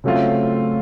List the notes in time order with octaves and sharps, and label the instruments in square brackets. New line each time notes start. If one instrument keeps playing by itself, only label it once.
[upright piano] C#3 F#3 A3 C4 F4